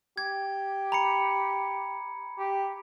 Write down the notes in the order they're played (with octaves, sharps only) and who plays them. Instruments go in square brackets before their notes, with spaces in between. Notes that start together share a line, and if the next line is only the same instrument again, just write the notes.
[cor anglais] G4 [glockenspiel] G#6
[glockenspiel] A#5 B5 C#7
[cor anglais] G4